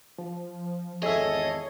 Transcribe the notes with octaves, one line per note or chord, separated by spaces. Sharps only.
F3
G#1 E2 G#4 A4 C#5 D#5 E5